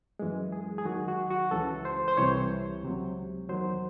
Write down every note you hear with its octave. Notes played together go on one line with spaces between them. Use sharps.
F#2 E3 G#3
G#4
G#4
D#2 D#3 F#3 F#4
F#4
F#4
C#2 C#3 E3 A4
C5
C5
C2 C3 E3 C#5
C#2 C3 F#3
E2 D#3 F#3 C5